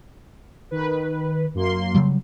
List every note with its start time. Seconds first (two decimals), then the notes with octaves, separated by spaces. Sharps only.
0.71 D#3 B4
1.55 F#2 A#3 C6
1.95 C#3 F#3 G3